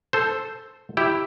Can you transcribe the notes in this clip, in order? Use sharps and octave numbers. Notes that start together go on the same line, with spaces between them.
A4 C5
E4 G4